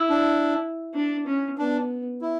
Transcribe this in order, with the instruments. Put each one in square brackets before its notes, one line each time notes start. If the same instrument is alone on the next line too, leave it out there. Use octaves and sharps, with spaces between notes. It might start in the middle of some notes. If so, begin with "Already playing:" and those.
Already playing: [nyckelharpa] E4
[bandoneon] D4
[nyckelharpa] D4
C#4
[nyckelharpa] B3 [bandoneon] D4
[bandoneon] E4